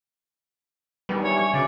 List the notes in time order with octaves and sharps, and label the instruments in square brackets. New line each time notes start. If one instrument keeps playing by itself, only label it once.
[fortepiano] D#3 B3 [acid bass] G3 [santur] D4 G#5
[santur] F4 E5 [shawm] C#5
[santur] D4 [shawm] C#5 [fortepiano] C#6
[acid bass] C#3 [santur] F#4 C#5 [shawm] D5